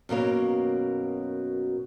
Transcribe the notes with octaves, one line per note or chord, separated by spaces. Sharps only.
F#2 B2 A#3 C#5